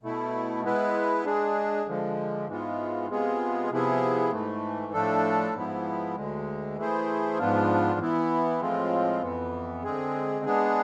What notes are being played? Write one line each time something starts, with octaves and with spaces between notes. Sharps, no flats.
B2 A3 E4
G#3 B3 E4 B4
G#3 D4 G#4
D3 F3 G#3
G#2 E3 G#3 B3 F4
C3 G#3 B3 F4 G#4
C3 F3 B3 E4 G#4
G#2 E3 A3
A2 F3 A3 D4 A4
G#2 F3 B3 E4
D2 D3 G#3
E3 A3 E4 G#4 C5
G#2 F3 B3 D4 F4
E3 B3 E4
A2 F3 G#3 C4 F4
F2 E3 B3
D3 G#3 C4 G#4
G#3 B3 D4 G#4